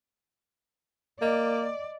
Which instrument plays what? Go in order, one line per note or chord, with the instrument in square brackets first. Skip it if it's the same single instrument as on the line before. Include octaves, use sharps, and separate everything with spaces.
[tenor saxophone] A#3 [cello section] D5 [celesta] D#5